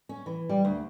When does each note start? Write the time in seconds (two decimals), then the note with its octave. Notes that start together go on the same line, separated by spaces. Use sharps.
0.09 C#4
0.26 E3
0.49 G3
0.65 D2